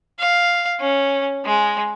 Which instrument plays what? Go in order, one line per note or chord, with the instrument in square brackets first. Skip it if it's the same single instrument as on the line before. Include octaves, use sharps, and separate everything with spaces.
[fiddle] F5
C#4
G#3